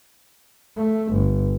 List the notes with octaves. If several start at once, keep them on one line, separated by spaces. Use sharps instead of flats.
A3
G1